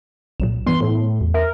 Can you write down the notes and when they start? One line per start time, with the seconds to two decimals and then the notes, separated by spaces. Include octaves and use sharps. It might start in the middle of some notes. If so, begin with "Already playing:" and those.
0.40 B1 A#2 F#3 E7
0.67 G2 E3 B3 C6
0.81 A2
1.21 E2
1.34 A#4 E5